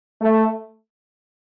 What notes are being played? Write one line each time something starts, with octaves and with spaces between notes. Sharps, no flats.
A3